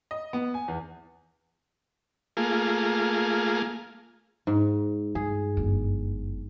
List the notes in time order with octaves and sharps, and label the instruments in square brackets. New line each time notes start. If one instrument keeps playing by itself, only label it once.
[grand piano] D#5
B3
G#5
E2
[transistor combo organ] A3 A#3 F4 G#4
[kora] G#2
[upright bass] G2 [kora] G#4
[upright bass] G1 F#2